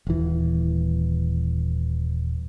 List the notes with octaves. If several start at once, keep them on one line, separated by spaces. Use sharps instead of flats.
D#1 E3